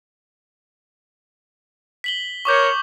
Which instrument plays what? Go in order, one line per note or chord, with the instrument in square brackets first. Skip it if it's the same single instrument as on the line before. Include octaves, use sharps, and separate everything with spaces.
[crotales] B6 F#7 G7
[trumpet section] A#4 C#5 [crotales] C#6 D6 G6